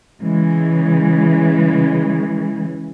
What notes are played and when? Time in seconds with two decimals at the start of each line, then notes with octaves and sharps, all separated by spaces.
0.21 C#3 E3 G#3